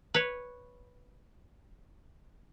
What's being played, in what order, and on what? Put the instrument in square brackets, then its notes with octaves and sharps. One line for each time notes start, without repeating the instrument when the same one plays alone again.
[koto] B4 C#5